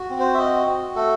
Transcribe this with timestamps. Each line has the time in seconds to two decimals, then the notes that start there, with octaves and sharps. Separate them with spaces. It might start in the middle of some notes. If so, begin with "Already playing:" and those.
Already playing: F#4
0.10 C4
0.20 C5
0.34 E5
0.38 F#4 D#5
0.67 F#4
0.96 A3 A4